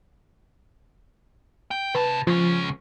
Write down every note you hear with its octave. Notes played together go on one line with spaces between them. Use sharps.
G5
C3 B4 A5
C#2 F3 C#4